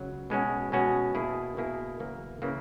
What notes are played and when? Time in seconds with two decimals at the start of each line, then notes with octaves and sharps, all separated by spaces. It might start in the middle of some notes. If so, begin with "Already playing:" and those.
Already playing: C#2 C#3 F#3
0.30 B2 G#3 C#4 F#4
0.72 B2 G#3 C#4 F#4
1.15 B2 A#3 E4 G#4
1.57 B2 A#3 E4 G#4
2.00 F#2 C#3 E3 A#3
2.42 C#3 E3 A#3